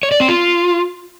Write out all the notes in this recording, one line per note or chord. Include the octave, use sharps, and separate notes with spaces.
C#5
D5
C4
F4